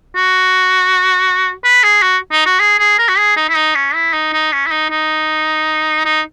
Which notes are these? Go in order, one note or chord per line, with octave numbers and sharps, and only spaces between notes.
F#4
B4
G#4
F#4
D#4
F#4
G#4
G#4
A#4
F#4
G#4
D#4
E4
D#4
C#4
E4
D#4
D#4
C#4
E4
D#4
D#4
D#4